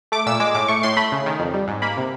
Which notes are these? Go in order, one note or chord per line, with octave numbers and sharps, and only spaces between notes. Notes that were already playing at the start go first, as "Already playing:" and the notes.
A3 D6
A#2 E6
G#3 D6
A2 D6
A3 C#6
A2 C6
A3 B5
C#3
D#3
F2
G3
G#2
A#3 B5
C3